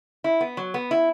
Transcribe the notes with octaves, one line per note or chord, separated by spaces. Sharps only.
E4
B3
F#3
B3
E4